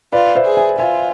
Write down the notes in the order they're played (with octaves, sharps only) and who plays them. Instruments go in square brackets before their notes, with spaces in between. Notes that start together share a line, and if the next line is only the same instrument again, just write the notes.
[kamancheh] F4 [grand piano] B4 D5
[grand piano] C5 E5
[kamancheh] G#4
[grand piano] E5 G#5
[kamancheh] F4 [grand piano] E5 G#5